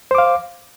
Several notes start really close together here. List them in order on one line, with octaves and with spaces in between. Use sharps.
C5 D6 F5